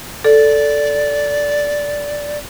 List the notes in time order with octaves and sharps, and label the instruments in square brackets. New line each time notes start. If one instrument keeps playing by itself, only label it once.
[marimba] A4 [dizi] D5